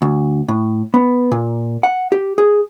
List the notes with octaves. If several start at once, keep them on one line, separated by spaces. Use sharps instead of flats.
D2
A2
B3
A#2
F#5
G4
G#4